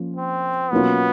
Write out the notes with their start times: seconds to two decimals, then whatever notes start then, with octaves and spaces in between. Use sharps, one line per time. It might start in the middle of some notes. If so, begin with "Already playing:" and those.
Already playing: F3 A#3 C#4 F4
0.17 C4
0.71 B2 F#3 A#3 B3 C#4 F4